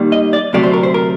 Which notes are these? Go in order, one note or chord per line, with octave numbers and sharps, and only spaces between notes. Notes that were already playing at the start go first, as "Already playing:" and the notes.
Already playing: D#2 D#3 G3 A#3
D#5
D5
D2 C3 F#3 A3 D5
C5
A#4
C5
A#4